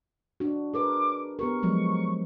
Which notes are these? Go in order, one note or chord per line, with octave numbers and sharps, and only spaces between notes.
D4 F#4
G#4 A#4 B4 D6
B3 G4 A#4 C#6
F3 F#3 G#3